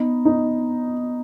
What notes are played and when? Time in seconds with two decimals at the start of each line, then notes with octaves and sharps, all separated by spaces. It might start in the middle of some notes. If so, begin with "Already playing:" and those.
Already playing: B3 D#4
0.25 D#4